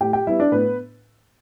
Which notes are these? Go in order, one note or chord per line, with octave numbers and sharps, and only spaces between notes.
A2 G4 G5
G4 G5
G3 B3 E4 E5
D4 D5
A2 B3 B4